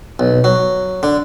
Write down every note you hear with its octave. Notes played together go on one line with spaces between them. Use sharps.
B1
F#3
D3